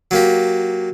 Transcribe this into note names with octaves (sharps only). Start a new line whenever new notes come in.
F#3 A#3 G4